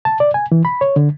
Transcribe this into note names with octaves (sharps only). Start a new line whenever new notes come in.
A5
D5
G#5
E3
B5
C#5
D3